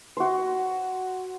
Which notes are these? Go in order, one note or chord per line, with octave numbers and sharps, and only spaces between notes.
F#4 C5